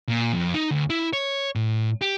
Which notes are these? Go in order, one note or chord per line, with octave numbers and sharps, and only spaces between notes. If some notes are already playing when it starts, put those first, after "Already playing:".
A#2
F2
D#4
D2
E4
C#5
A2
G4